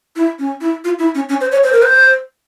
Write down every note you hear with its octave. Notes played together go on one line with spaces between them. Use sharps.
E4
C#4
E4
F4
E4
C#4
C#4
C5
C#5
C5
A#4
C5